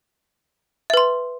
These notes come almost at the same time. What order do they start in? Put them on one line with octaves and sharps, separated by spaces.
E5 B4 C6